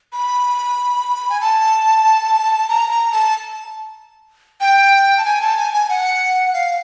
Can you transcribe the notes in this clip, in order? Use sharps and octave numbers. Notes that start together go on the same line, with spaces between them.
B5
G#5
A5
A#5
A#5
A5
G5
A5
G#5
A5
G#5
G#5
F#5
F5